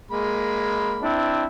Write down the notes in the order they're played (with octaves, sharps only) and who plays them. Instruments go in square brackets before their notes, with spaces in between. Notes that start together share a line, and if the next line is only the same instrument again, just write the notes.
[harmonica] G#3 A#3 B5
[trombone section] C4 D4 E4